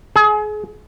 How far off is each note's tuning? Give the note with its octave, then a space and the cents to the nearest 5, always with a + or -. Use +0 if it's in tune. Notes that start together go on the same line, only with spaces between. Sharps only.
G#4 +30